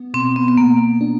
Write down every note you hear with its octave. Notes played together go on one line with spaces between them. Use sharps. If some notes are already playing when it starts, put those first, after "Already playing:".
Already playing: B3
B2 C4
B3
B3
B2 A#3
D4